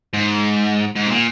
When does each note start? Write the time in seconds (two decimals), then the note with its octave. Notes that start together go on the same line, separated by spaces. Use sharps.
0.14 G#2
0.96 G#2
1.06 C3
1.11 A#2